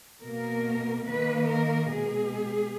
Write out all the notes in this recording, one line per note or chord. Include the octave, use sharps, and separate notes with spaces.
B2 A#3 A#4
D#3 A#3 B4
A#4
B2 G#3 G#4